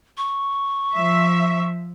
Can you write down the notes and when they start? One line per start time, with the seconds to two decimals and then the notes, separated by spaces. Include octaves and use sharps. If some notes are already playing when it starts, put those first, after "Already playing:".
0.17 C#6
0.95 F3 E5